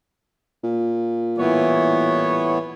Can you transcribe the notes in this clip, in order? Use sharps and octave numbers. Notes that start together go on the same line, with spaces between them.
A#2
A2 E3 G3 B3 C#5